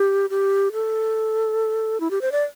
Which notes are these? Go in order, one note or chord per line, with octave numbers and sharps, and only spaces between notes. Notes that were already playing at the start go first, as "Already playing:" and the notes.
Already playing: G4
G4
A4
E4
G4
C5
D5